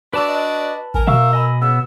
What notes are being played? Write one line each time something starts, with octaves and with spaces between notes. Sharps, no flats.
D4 F#4 B4 D5 A5 E6
D#5
G#1 A#4 G#5
B2 E5 F5 C#6 E6
D#5 G#5 B5
C#3 B3 E6